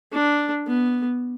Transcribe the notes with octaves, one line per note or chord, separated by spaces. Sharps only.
D4
B3